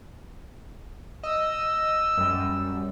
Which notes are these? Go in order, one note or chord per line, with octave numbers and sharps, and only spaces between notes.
D#5 E6
F#2 G3